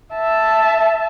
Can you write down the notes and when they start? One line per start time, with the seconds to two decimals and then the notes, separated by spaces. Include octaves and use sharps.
0.13 E5 A5